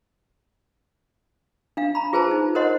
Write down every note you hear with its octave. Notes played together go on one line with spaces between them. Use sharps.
D4 F5
A#5 B5
F4 G#4 B4 C5 A5 A#5
D#4
A#4 C5 C#5 D#5 F#5 C6